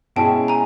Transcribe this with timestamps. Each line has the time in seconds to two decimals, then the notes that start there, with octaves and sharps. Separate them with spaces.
0.16 B2 G#3 C#4 E4 G#4 G5 A5
0.48 G#5 A#5